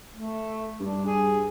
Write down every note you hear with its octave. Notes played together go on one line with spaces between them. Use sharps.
A3
G2 D4
G#4